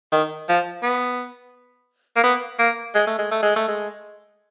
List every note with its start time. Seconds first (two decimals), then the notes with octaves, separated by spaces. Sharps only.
0.12 D#3
0.49 F3
0.83 B3
2.16 A#3
2.24 B3
2.59 A#3
2.95 G#3
3.07 A3
3.19 G#3
3.32 A3
3.43 G#3
3.56 A3
3.68 G#3